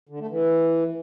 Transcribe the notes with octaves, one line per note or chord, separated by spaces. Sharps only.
D3
A3
E3